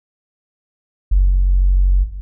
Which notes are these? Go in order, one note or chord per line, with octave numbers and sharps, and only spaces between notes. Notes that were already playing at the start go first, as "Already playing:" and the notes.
F#1